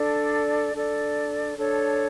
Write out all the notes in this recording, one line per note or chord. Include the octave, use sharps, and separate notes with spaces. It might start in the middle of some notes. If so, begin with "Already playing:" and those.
Already playing: D4 A4 D5
D4 A4 D5
D4 A4 C#5